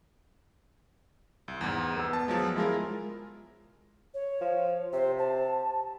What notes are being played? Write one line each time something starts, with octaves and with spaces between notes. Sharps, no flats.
C2
E2 G#2
B3 E6
A5
F3 F#3 G#3
G#3 E4 F4 A#4
C#5
F3
C3 C5
A5